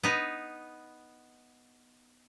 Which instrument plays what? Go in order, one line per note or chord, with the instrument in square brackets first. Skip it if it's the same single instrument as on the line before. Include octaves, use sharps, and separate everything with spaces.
[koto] B3 D#4